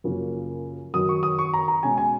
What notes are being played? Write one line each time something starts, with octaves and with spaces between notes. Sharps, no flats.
F#2 C#3 F3 A#3 C#4
F#2 D#3 F#3 D#6
C#6
D#6
C#6
A#5
A#5
B2 G#3 C#4 G#5
G#5